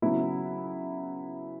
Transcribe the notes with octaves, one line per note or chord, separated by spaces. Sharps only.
C#3 F#3 B3 E4